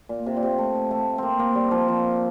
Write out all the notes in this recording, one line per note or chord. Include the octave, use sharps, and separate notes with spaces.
A#2
C3
A#2
C3
A3
A3
A#3 C4
A#3
G3
F3
F3